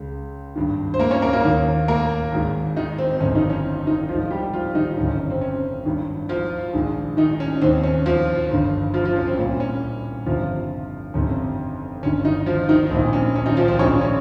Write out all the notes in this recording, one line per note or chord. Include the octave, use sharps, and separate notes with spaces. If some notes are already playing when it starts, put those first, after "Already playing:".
Already playing: C#2 C#3
G#1 G2 D#3
C5
A#3 A#4
C#4 C#5
A#3 A#4
A#3 A#4
D#2 D#3
A#3 A#4
G#1 G#2 D#3
D#3 D#4
C4
G1 F2 C3 C#4
D#3 D#4
C#4
D#3 D#4
G#1 G#2 D#3 F3 F4
G3 G4
F3 F4
D#3 D#4
G1 F2 C3 D#3 C#4
C#4
C4
C#4
G#1 G2 D#3
F3 F4
A#1 G#2 D#3
D#3 D#4
C#4
D#2 D#3 C4
C#4
F3 F4
G1 G2 D#3
F3 F4
F3 F4
C#4
C4
C2 A#2 C#4
C#4
G1 F2 C3 D#3 F3 F4
G1 F2 C3 D#3 C#4
G1 G2 D#3 C#4
D#3 D#4
F3 F4
D#3 D#4
A#1 A#2 C4
C#4
C#4
D#3 D#4
F3 F4
C4 C5
A#1 G#2 D#3 C#4 C#5
C#4 C#5